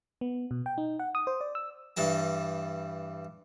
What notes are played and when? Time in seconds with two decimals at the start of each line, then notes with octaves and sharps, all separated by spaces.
0.21 B3
0.51 B2
0.66 G5
0.78 D#4
0.99 F#5
1.15 D#6
1.27 C5
1.41 D5
1.55 E6
1.97 G2 E3 G3 A5